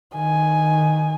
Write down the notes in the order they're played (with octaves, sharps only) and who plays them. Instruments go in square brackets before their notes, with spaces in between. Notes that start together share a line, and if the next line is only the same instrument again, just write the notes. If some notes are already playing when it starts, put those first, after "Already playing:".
[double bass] D#3 [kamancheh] G#5